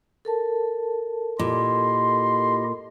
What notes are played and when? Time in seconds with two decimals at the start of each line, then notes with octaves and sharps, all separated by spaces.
0.25 A4 A#4 A5
1.39 A#2 E4 G4 D#5 C6